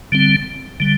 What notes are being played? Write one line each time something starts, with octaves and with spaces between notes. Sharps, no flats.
D3 G3 C4
D3 G3